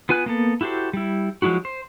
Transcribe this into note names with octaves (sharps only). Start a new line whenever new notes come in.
B3 F4 B4 G#5 F#6
A#3 B3 A4
E4 F#4 G4 A4 C5
G3 E4
F3 F#3 G#3 E4 F#4
C5